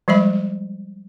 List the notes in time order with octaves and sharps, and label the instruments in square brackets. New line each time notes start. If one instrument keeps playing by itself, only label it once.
[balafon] F3 G3 G#3 E5 B5